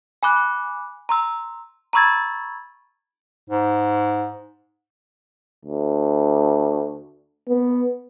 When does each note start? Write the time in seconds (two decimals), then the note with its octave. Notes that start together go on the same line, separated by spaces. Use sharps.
0.23 G#5 B5 D6 F#6
1.09 A#5 C6 E6
1.93 A#5 B5 C#6 E6 G#6 A6
3.50 G#2
5.65 D2
7.48 B3